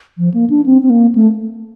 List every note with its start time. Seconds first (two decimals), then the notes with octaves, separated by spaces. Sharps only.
0.18 F3
0.34 A#3
0.50 D4
0.66 C4
0.82 C4
0.90 A#3
1.15 A3